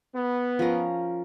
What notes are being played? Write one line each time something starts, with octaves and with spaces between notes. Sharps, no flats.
B3
F3 C#4 A#4